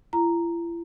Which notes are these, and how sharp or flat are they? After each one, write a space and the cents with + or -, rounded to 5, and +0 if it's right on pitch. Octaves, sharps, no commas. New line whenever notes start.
E4 +45 A#5 +0